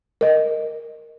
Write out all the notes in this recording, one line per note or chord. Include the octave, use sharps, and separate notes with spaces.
A#4 D#5